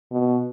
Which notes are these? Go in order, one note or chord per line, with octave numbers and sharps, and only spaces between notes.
B2